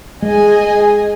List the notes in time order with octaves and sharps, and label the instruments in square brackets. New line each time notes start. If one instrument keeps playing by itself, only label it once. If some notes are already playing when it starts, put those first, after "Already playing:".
[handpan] G#3 [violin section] G#4 D#5 G#5